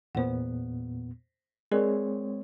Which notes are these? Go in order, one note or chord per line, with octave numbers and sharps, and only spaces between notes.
E2 A#2 B3 C5 F#5
G#3 C4 G#4 A#4 C#5 D5